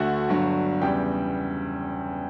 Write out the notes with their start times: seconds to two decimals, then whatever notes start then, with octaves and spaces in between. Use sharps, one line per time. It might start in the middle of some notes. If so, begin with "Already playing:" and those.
Already playing: D2 D3 A3 F#4 F#5
0.29 G1 G2 F#3
0.81 E2 C#3 G3 B3 G4 G5